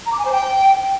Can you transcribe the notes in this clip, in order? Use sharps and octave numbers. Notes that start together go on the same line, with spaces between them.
A#5
D6
G#5
C5
G5